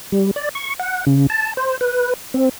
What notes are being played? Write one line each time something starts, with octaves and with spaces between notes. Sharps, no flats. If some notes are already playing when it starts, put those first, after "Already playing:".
G3
D5
C#6
F#5
C#3
A5
C5
B4
C4